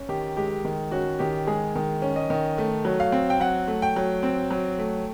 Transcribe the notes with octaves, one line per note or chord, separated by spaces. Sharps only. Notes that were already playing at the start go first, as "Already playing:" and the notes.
Already playing: C#4
D#3 G4
G#3 G4
D#3
C#4 F#4
D#3 G4
G#3 G#4
D#3
C#4
D#5
D#3
A3
F#3
F5
C4
G5
F#3 F#5
A3
G5
F#3
C4
F#3
A3